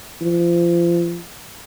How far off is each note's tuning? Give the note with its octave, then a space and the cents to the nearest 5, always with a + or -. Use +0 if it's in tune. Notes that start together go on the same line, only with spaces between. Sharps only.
F3 -30